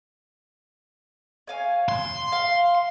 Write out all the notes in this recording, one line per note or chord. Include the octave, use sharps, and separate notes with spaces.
C#5 F5 G#5
C6
F5